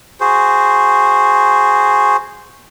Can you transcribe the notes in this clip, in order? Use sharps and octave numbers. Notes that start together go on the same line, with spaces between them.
F#4 G#4 C5